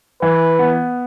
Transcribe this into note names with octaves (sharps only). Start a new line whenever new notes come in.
E3 B4
B3